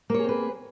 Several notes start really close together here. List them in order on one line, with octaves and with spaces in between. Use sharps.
A#3 C#5 G#4 C4 B4